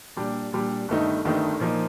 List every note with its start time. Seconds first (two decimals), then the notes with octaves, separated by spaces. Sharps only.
0.17 A#2 G3 D4
0.53 A#2 G3 D4
0.88 G1 G2 D#3 A3 D#4
1.25 G1 G2 D#3 A3 D#4
1.60 A#2 F3 A#3 D#4